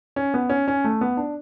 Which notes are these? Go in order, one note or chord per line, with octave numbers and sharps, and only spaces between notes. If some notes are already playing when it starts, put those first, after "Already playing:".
C#4
B3
C#4
C#4
A3
B3
D4